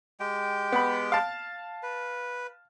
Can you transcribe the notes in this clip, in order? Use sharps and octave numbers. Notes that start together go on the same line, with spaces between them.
G#3 G4 G5
B3 B5
F5 A5
B4